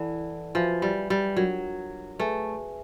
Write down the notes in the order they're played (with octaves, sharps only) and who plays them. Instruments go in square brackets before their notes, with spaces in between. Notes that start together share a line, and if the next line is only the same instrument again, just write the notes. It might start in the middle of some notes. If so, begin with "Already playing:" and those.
Already playing: [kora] E3 [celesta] E4 A4 D5 F#5 A5
[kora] F3 [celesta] F#4 B4 E5 G#5 B5
[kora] G3
G3
[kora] F#3 [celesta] D4 F4 A#4
[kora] A3 [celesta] G#4 B4 E5 G#5